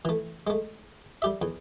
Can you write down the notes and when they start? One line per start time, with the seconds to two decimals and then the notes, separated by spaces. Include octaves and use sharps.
0.05 E3 A3
0.47 G#3 A3
1.22 G3 G4 E5
1.42 E2